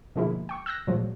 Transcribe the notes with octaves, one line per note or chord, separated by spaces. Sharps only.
B2 D3 F3 G#3 A#3 E4
G5 C#6
E6 F#6 G6 A#6
A#2 F3 F#3 G#3